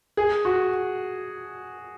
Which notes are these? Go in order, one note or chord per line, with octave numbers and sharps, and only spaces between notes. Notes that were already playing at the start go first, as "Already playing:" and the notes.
G#4
F#4